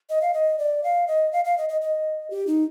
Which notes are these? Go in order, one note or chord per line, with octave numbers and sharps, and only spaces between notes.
D#5
F5
D#5
D5
F5
D#5
F5
F5
D#5
D#5
D#5
G4
D#4